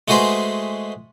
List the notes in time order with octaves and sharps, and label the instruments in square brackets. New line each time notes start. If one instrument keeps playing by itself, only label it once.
[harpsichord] G#3 A3 F#4 G#4 B4 C5